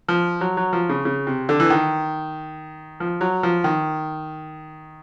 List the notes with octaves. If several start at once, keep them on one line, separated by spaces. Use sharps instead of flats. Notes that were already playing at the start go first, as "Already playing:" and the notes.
F3
F#3
F#3
F3
C#3
C#3
C3
D3
E3
D#3
F3
F#3
F3
D#3